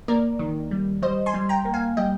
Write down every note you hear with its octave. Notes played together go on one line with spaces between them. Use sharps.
A#3 A#4 D5
D#3
G3
G3 C5 D#5
G#5 C6
G3
G5 A#5
A#3
F5 G#5
G3 D#5 G5